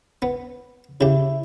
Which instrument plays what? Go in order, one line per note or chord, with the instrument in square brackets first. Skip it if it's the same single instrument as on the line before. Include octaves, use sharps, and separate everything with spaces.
[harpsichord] B3
[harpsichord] C#3 G4 [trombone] E4